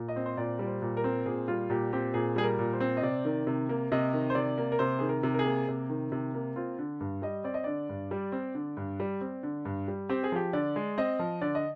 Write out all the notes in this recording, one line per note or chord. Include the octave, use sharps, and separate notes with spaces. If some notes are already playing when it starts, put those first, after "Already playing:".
Already playing: A#2
D#5
C4
C5
A#2 D5
G3
C5
A#2
A#4
C4
A#2 G#4
G3 F4
A#2 G4
C4 G4
A#2 G#4
G3 G#4
A#4
A#2
C5
C4
D#5
C3 D5
D#3
C3
A#3
C3 D#5
D#3
C5
C3 D5
A#3
A#4
C3 C5
D#3 G#4
A#4
C3
A#4
G#4
A#3
C3
D#3
C3
A#3
C4 F4
D3
G2
G3 D#5
C4 D5
D#5
D3 D5
G2
G3
C4
D3
G2
G3
C4
D3
G2
G3
C4 G4
G#4
F3 G4
D3 D5
G#3
C4 D#5
F3
D3 D5
D#5